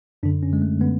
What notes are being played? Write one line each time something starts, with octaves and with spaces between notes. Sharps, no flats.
F#2 D3 D4
C#4
G#3
A3
D3 B3